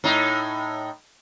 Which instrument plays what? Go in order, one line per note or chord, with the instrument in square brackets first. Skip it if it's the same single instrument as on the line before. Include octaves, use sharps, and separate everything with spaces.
[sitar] A2 D#4